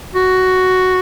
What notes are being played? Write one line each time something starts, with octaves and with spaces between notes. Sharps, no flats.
F#4